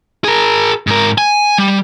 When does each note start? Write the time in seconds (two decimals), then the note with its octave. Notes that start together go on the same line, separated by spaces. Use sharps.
0.24 G#4 A#4
0.87 G#2 A#4
1.18 G#5
1.58 G3